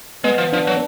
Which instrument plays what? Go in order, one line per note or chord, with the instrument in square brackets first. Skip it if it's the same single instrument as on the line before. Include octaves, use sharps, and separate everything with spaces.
[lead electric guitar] G#3 [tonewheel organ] B3
[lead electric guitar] F3
[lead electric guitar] F3 [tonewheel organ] D4
[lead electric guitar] F#3